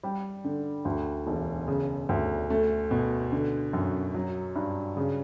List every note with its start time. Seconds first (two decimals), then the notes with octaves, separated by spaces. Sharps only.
0.03 G3
0.44 D3
0.85 D2
1.27 E1
1.68 C#3
2.09 D2
2.50 A3
2.91 B2
3.32 D3
3.73 F#2
4.15 F#3
4.56 G2
4.97 C#3